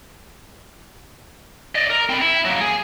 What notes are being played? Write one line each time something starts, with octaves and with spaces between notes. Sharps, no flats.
D5 D#5
A#4
C4 B5
E4
F#3 A#3
G#4